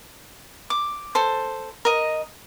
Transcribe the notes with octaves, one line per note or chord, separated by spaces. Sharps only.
D6
A4 C5
A#4 D#5